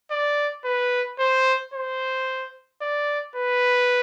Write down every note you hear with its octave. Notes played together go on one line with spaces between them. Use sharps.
D5
B4
C5
C5
D5
B4